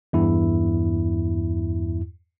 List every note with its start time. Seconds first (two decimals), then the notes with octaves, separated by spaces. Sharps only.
0.13 E2 G2 E4